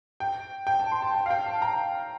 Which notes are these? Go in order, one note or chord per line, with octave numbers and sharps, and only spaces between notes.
G5
G5
A5
C6
A5
G5
F5
G5
A5
A#5